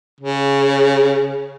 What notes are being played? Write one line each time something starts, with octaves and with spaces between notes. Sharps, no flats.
C#3